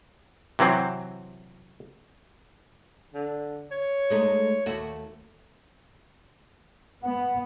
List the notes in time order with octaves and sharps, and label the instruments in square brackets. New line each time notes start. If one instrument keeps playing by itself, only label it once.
[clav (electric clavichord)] C3 E3 F#3 C4
[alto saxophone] D3
C#5
[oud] G#3 A3 D#4
[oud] D#2 F#4 [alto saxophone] A3
[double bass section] B3 [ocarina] F#5